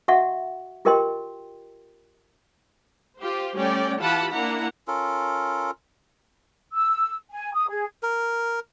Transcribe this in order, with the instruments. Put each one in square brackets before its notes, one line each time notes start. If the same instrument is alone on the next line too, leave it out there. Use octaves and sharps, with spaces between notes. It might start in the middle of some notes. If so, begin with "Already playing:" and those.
[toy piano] F#4 D#5 E5 F#5 C#6
F4 G4 A#4 D#5 G5 C6
[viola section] F4 G4 C5
G3 A3 C#4 D5 G5
E3 F4 G4 F#5 A5 B5
A#3 D4 E4 F#5 A#5
[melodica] C#4 F4 A4 A#4
[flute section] E6
G#5
D#6
G#4
[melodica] A#4